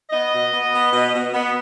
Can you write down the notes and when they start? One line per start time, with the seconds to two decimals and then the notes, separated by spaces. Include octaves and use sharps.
0.11 B3 D#5
0.32 B2
0.53 B3
0.73 B3
0.92 B2
1.13 B2
1.34 B3